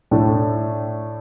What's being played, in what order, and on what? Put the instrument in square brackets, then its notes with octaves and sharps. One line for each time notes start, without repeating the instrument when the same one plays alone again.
[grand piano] A2 A3 D4